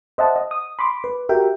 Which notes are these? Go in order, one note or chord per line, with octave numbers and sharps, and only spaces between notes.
C5 D#5 E5 F#5 A5
D#5
D#6
B5 C6 D6
B4
F#4 G4 A#4 E5 G5